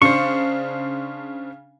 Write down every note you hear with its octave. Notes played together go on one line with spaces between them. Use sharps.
C#3 D4 C5 C#6